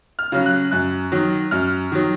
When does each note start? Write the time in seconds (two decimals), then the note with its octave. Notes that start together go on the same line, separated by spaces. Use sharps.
0.19 F6
0.32 C#3 F#3
0.46 F#6
0.71 F#2 F#6
1.12 D#3 F#3
1.51 F#2 F6
1.92 D#3 F#3